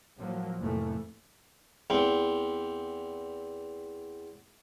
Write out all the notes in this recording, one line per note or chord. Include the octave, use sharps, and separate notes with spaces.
A2 F3 F#3 A#3
F1 F2 A2 E3 A3 A#3
E2 C4